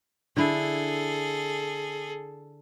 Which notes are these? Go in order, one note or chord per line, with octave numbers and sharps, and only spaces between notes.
D3 E4 G#4 A4